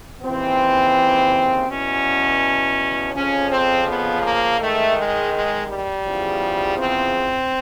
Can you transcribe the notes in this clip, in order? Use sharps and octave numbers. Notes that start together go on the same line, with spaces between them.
D#2 C#3 E3 C4
E2 B2 C#4
F2 C#3 F3 C#4
C4
B3
A#3
G#2 D#3 A3
G#3
G#3
G3
E2 C#3 F3
C4